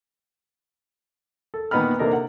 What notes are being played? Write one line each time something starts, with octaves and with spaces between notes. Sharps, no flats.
A4
A#2 D#3 B3 D#5 B5 F6
C3 A#3 D4 D#4 A4 A#4
F#5